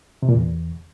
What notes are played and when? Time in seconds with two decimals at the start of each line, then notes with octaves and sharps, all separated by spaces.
0.22 C3
0.29 A#2
0.35 E2